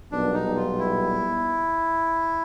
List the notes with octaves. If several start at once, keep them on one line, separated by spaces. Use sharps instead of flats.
B1 A#2 G3 B3 D4
D#4
F4
E4